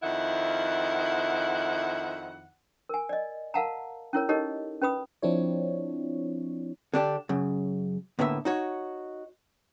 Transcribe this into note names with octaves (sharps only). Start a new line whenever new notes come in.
F2 D#3 E4 F#5
A#4 G#5
D5 D#5
A#4 F5 F#5 A5 A#5
C#4 E4 A#4 C#5
D#4 G4 A4 A#4 C#5 D#5
C#4 B4 B5 D#6
F3 C4 D4 E4 C#5
D3 D4 G4
F#2 C#3
A2 D3 A#3 B3 C5 E5
D#4 F#4 C#5